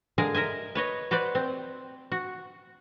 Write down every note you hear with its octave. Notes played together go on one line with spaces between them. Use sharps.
D3 G#3 G#4 A#4 F5
A#4 D#5 E5 G#5
B4 C#5 D#5
F#4 B4 C5 D5
C4
F#4